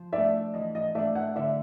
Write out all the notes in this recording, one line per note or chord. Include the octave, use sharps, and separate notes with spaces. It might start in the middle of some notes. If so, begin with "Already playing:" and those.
Already playing: F3
A3 D4 D5 E5
E3 D#5
D#5
A3 D4 D5 E5
E5 F#5
D3 D5 E5